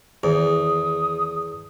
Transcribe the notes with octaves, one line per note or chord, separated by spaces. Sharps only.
E2 D#3 G#4 D#6